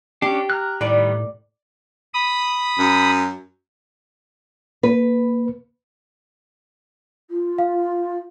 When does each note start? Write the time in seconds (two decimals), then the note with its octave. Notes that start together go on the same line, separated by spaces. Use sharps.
0.22 C#4 D4 G4
0.50 A#5 F6 F#6
0.81 A2 D#3 G3 B4 D5
2.14 B5 D#6
2.78 F#2
4.83 A#3 B4
7.30 F4
7.58 F5